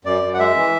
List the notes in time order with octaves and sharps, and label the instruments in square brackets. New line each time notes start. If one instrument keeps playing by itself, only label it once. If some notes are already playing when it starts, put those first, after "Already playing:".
[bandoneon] F#2 D5
F#2
F#5
G#3 E5
E3